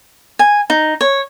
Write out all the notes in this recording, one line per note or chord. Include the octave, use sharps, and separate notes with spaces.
G#5
D#4
C#5